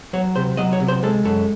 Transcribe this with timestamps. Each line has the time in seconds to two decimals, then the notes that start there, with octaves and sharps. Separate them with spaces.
0.13 F#3 C#5
0.35 C3 C5
0.57 F#3 D#5
0.73 C#5
0.80 C3
0.88 C5
1.03 G#3 A4
1.24 F#2 A4